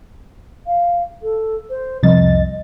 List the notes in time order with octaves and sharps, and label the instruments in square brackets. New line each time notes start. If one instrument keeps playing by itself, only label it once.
[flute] F5
A4
C5
[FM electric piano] C2 F2 A6 [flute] D#5